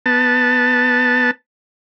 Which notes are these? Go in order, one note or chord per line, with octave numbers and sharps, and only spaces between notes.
B3 A5